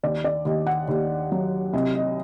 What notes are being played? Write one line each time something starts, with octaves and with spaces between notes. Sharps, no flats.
D#2 D5
D5
D#2 D#5
F#5
D#2
F#3
C2 D#5
D#5